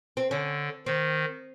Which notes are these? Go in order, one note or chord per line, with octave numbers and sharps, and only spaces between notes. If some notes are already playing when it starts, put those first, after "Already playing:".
C4
D3 C#4
D#3 C4